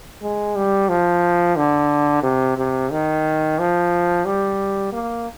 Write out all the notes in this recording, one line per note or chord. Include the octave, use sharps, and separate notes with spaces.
G#3
G3
F3
D3
C3
C3
D#3
F3
G3
A#3